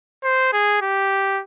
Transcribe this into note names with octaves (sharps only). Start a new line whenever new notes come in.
C5
G#4
G4